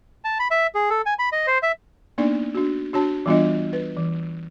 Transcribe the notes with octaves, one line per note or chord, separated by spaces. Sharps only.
A5
B5
E5
G#4
A4
G#5
B5
D#5
C5
E5
A#3 B3 D4 D#4 D5
D4 F#4
D4 F#4 C#5 A5
E3 G3 B3 D4 F4 D#5
B4
E3